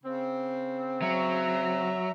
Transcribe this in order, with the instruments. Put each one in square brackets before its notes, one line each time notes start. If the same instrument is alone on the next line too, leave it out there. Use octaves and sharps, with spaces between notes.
[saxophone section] C#3 C4
[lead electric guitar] F#3 [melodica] E5 A#5